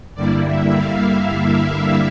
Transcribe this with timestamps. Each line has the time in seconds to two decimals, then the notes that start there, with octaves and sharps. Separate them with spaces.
0.15 G2 D3 G3 A#3 E4 D5
0.45 E5
0.76 F5
1.07 E5
1.38 F5
1.68 F5